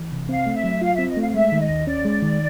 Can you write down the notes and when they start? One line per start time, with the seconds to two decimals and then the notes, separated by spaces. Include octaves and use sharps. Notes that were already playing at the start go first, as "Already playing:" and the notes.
Already playing: E3
0.12 C3
0.29 C4 F5
0.46 A3
0.55 E5
0.64 F#3
0.81 F4 F5
0.94 C4 E5
1.09 D#5
1.17 A3 F5
1.28 F5
1.34 G#3 E5
1.52 D#3
1.61 D#5
1.69 D#2
1.87 C#4 D5
2.05 G#3
2.22 D#3